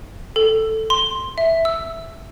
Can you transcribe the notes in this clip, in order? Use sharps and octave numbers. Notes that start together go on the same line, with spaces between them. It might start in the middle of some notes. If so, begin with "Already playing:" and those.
A4
C6
E5
E6